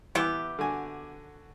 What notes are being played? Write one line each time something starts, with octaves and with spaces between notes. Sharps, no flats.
E3 B3 E4 G4
D3 F#4 G#5